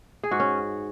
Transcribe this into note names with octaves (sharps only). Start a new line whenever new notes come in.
G#4
G#2 F#4
C#4